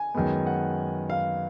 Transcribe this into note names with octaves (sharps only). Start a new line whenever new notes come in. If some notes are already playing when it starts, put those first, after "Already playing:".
Already playing: G#5
F#2 D#3 G#3 B3
F#5
F5